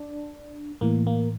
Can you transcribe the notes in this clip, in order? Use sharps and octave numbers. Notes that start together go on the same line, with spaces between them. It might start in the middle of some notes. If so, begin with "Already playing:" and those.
Already playing: D4
A2 E3 A#3
A#3